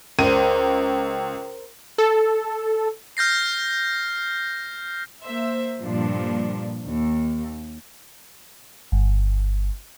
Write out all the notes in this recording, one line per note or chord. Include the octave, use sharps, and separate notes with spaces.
C#2 A#4 C5 D#7
A4
F6 G6 A#6 C7
A#3 C5 E5
G2 A#2 F3 D4
D#2
G1